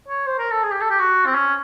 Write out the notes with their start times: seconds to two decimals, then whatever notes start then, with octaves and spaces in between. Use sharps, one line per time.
0.08 C#5
0.26 C5
0.39 A#4
0.51 A4
0.63 G#4
0.71 G4
0.81 A4
0.90 G4
0.99 F#4
1.26 C4
1.35 C#4